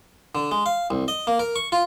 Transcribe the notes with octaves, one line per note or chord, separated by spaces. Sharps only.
D3
G#3
F5
C2
D#5
A#3
A#4
C#6
F4